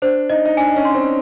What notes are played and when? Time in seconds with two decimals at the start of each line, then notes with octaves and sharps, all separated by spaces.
0.02 D4 C5
0.30 D#4 D#5
0.46 D#4
0.57 D4 G#5
0.76 C#4
0.85 C6
0.95 C4